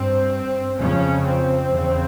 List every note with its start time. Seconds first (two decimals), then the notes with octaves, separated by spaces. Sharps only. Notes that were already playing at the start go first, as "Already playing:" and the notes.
Already playing: G2 C4
0.79 F2 C#3 C#4
1.24 C4
1.71 E2 C#3